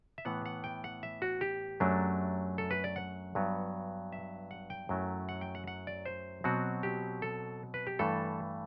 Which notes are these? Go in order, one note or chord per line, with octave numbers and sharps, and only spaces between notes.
E5
A2 E3 B3 F#5
F#5
G5
F#5
E5
F#4
G4
F#2 F#3 A3 D4
A4
B4
D5
F#5
G2 F#3 B3
E5
F#5
G5
F#2 F#3 A3 E4
F#5
G5
F#5
F#5
D5
C5
B2 F#3 C4 F#4
G4
A4
B4
G4
G2 E3 A3 A4